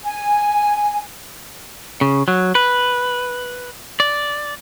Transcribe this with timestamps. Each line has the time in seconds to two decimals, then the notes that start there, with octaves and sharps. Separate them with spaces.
0.04 G#5
2.01 C#3
2.28 F#3
2.55 B4
4.00 D5